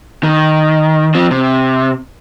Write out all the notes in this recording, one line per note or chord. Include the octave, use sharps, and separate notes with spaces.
D#3
F3 C4
C3